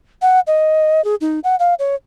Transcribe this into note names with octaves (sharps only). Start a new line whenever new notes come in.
F#5
D#5
G#4
D#4
F#5
F5
C#5